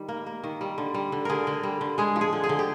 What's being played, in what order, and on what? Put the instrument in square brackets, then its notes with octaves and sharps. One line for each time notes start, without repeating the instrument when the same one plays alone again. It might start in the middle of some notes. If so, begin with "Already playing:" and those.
Already playing: [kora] D#3 G3
A#3
A#3
D#3
G3
D3
G3
D3
D3 G#4 A#4
D3
G3
D3
G#3 G#4
F3
G#4
D3
G#4
D3
G4